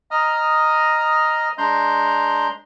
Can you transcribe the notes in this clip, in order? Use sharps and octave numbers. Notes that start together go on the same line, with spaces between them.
D#5 A#5 D#6 F6
G#3 D4 A#5 C6 G6